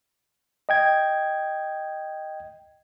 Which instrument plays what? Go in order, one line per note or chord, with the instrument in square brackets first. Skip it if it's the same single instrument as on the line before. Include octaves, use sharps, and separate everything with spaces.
[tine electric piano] D#5 G5 G#6